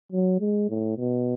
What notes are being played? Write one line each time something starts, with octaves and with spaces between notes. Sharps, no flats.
F#3
G#3
A2
B2